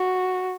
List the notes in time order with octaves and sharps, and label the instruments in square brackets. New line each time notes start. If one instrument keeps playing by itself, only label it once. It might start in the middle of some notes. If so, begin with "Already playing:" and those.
Already playing: [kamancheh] F#4